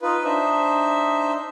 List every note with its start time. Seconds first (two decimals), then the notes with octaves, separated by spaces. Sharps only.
0.02 D#4 F4 B4
0.24 D4 D#4 C5 E5